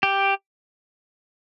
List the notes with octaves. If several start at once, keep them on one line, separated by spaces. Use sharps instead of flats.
G4